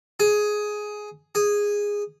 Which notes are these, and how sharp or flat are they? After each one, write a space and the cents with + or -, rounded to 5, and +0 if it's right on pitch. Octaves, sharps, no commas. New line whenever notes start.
G#4 +10
G#4 -10